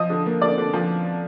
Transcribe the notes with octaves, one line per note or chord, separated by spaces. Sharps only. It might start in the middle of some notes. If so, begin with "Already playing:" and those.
Already playing: F3 D#5 D#6
D3
A#3
D3 D5 D6
D3
F3